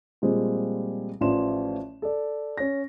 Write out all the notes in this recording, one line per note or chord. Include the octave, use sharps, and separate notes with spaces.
A#2 F3 G3 G#3 C4
A1 A2 F3 D5 C6 E7
A4 D5
C#4 A#6